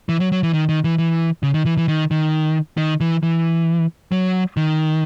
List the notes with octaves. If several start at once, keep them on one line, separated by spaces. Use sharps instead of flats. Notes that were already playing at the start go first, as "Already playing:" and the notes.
E3
F#3
F#3
E3
D#3
D#3
E3
E3
C#3
D#3
E3
E3
D#3
D#3
D#3
E3
E3
F#3
D#3